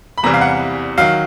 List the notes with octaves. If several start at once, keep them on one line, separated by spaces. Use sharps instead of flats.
B5
E2 C3 E3 G3 A#5
F5
F#5
D#3 F#3 F5